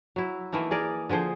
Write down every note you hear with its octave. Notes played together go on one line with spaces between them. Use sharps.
F#3 E4
E3 A3 A#3 D#4
G#4 A#4 D5
D3 F3 G#4 C5